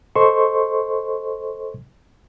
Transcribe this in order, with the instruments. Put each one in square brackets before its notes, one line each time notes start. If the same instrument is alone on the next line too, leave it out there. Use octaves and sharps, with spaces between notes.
[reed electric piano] A4 C5 D#5 C6 C#6